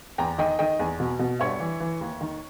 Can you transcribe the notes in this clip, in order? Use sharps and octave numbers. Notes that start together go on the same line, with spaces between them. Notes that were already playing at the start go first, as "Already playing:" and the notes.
E2 G5 A#5
D#3 D#5 G5
D#3 D#5 G5
E2
B2
B2
G2 C#5 E5
E3
E3
D#2
D#3